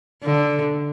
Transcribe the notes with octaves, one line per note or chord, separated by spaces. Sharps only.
D3